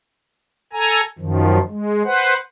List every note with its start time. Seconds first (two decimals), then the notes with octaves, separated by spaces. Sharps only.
0.73 A4 G#5 A#5
1.19 F#2 D#3 F3
1.69 G#3
2.05 B4 C5 F#5